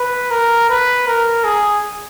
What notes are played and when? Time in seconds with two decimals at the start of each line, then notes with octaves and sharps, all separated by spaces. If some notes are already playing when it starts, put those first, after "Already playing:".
Already playing: B4
0.31 A#4
0.70 B4
1.07 A#4
1.44 G#4